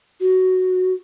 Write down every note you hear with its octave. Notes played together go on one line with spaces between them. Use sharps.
F#4